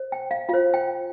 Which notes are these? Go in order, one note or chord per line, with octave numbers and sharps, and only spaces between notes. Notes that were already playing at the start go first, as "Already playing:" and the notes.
Already playing: C5
G5
F5
F4 C5 F5
G5